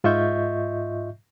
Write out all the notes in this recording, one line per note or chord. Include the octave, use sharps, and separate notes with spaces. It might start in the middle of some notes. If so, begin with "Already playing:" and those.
G#2 F4 D#5 E5 C#6 G6